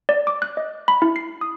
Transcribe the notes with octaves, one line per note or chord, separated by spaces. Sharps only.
D5
D6
F#6
D#5
B5
E4
C7
D#6